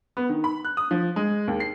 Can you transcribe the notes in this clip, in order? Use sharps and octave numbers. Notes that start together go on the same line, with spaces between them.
B3
D#3
B5
F#6
D#6
F3
G#3
D#2
C7